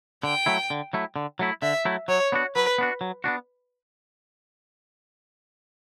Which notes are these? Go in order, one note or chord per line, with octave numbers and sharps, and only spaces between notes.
D3 G5
F#3 A3 E4
D3
F#3 A3 E4
D3
F#3 A3 E4
D3 E5
F#3 A3 E4
F#3 C#5
B3 D4 F#4
F#3 B4
B3 D4 F#4
F#3
B3 D4 F#4